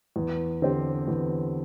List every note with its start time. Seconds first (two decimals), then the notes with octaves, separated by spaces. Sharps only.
0.16 E2
0.62 D3 C4 G4 C5
1.08 E2